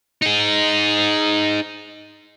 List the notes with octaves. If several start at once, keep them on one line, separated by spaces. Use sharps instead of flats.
D#4 G#4